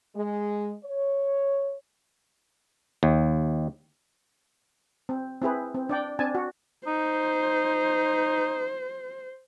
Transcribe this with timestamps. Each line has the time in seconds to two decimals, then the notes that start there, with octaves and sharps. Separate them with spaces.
0.16 G#3
0.84 C#5
3.03 D#2
5.09 C4
5.42 C4 E4 G#4 B4
5.75 C4
5.89 D4 D5 G5
6.19 C4 D4 G#5 A5
6.35 F#4
6.87 D#4 C5